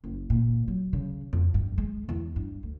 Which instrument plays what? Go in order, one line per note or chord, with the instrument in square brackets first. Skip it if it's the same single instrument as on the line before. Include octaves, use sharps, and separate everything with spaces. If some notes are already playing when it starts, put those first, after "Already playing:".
[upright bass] F#1
A#2
F#3
C#3
F2
G2
G#3
E2
G2
D2